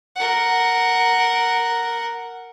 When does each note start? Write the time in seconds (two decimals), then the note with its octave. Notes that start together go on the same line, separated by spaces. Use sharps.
0.16 A#4 F#5